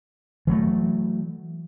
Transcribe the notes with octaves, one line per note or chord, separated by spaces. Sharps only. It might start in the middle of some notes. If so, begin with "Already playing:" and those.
E3 F#3 A3